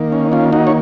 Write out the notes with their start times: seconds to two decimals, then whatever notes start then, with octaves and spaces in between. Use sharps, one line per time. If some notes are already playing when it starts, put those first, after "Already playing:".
Already playing: D#3 A#3
0.12 C#4
0.32 C#4 F4
0.53 D#4 F#4
0.67 C#5